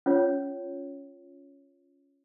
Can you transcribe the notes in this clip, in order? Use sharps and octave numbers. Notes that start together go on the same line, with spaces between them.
C#4 F4 C#5